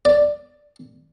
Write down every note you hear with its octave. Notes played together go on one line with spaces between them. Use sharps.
D5